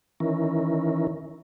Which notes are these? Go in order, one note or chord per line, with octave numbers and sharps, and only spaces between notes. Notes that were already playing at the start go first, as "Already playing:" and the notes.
D#3 E3 C#4 E4 A#4